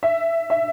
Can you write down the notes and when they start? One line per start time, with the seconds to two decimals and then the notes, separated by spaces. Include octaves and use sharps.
0.03 E5
0.50 E5